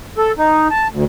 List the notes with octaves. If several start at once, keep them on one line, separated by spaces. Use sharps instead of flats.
A4
D#4
A5
D2